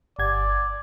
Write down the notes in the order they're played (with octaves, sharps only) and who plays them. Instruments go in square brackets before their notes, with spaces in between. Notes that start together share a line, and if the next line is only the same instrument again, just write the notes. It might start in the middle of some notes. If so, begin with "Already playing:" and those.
[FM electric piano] G1 G#6 [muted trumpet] D5